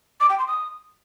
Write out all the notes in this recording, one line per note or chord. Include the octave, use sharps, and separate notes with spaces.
D6
G5
C6
D#6